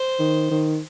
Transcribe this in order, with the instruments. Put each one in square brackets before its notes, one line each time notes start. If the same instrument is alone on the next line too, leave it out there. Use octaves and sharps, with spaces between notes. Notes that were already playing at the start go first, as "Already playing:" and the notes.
Already playing: [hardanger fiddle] C5
[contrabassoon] D#3
D#3